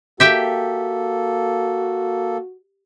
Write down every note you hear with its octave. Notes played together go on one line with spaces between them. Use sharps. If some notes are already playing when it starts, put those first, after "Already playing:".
A#3 F#4 G4 A4 E5 G5